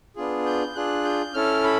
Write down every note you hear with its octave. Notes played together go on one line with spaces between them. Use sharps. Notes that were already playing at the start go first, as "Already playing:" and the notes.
B3 D4 F4 G#4
G6
D4 F4 G#4 F#6
G6
C#4 E4 A4 F6
B5